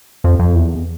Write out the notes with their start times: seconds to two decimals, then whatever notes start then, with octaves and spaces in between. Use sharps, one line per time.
0.24 F2
0.39 F2
0.55 E2